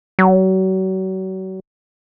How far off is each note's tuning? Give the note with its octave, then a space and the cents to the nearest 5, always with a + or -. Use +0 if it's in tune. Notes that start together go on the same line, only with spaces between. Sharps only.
F#3 +35